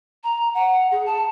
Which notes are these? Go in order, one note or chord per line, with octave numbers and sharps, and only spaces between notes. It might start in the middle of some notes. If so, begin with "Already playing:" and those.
A#5
F#5
G#4
A5